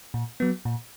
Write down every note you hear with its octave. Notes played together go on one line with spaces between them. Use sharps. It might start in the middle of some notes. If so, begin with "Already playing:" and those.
A#2
F#3 B3
A#2